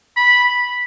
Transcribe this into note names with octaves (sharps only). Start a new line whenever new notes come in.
B5